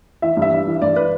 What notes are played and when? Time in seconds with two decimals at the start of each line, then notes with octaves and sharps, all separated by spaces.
0.22 E3 E5
0.37 G2
0.42 E5
0.52 G2
0.67 E3
0.82 G2 D5
0.96 B4